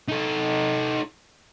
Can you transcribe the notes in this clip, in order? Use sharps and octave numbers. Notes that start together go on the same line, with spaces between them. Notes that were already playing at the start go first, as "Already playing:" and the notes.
D#4 A4